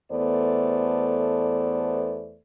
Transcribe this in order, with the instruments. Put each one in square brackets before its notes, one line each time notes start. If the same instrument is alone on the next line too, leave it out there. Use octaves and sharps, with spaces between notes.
[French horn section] E2 A3 B3 A4 C5 D5